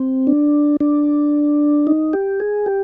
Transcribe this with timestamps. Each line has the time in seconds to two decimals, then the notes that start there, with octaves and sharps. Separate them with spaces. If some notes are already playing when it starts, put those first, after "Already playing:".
Already playing: C4
0.27 D4
0.81 D4
1.87 D#4
2.13 G4
2.40 G#4
2.66 G4